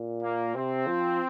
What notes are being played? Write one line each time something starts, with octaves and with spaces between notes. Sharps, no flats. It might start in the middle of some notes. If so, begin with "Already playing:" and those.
Already playing: A#2
A#3
C3 C4
F3